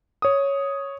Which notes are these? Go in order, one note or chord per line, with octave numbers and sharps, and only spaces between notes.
C#5 D#6